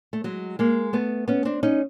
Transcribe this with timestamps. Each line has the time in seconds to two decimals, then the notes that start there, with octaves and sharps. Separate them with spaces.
0.13 A3
0.24 F#3 G#3
0.59 G#3 A#3
0.93 A3 B3
1.28 B3 C#4
1.45 C4 D4
1.63 C#4 D#4